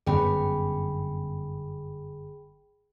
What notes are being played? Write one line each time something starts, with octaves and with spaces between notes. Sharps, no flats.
G1 F#2 B3 G#4 G5 B5